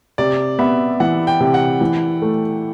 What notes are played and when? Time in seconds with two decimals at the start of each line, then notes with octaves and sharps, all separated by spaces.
0.18 C3 D5
0.59 B3 E5
1.00 E3 F#5
1.27 G5
1.40 C3
1.54 F#5
1.81 E3
2.22 A3